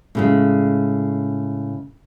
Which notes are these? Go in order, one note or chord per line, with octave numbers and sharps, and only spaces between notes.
A2 C#3 G#3